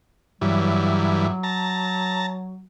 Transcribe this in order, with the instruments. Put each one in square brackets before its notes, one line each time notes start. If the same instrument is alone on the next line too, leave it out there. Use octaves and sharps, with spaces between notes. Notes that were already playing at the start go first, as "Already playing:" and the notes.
[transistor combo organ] G2 E3 [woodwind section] F#3
[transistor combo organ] A5 A#5